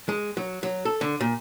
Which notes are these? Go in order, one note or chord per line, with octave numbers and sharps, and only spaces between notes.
G#3
F#3
F#3
A4
D3
A#2